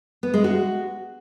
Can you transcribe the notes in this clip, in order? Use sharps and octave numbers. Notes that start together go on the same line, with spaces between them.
B3
G#3
F#4